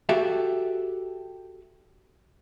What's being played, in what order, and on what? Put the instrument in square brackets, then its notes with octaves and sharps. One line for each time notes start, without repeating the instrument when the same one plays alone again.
[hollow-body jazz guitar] F#4 G4 A4 E5